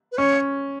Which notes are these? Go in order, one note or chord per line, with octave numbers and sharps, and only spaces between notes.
B4
C#4 C#5